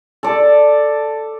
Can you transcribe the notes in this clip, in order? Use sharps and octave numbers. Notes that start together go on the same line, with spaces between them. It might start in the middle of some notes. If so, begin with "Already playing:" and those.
A4 D5